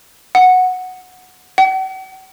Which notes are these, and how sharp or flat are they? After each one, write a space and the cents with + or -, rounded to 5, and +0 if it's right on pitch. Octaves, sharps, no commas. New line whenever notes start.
F#5 -5
F#5 +45